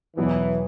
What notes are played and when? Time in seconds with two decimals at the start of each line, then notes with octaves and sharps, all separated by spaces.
0.16 E2 B2 E3 F#3 B3